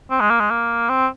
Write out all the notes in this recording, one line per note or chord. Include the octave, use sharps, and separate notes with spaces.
C4
G#3
A#3
G#3
A#3
C4